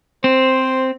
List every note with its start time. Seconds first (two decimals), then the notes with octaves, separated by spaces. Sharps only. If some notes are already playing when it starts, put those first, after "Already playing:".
0.24 C4 C5